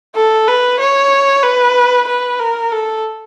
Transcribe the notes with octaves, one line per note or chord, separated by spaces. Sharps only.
A4
B4
C#5
B4
B4
A#4
A4